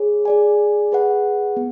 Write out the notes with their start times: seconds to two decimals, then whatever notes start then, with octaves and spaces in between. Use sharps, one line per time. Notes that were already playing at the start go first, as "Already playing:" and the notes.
Already playing: G#4 C#5
0.25 G#4 D5 G#5
0.92 G#4 B4 F#5
1.57 B3